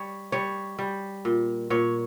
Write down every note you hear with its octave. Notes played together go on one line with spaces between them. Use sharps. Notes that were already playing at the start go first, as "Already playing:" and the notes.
Already playing: G3 C#5
G3 C#5
G3
A#2
A#2 C#5